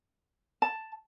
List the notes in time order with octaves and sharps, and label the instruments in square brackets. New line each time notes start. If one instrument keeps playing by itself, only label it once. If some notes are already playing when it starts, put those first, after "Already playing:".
[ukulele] A5